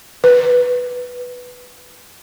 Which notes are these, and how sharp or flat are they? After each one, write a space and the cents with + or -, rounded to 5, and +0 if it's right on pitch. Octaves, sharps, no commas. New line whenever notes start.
B4 +0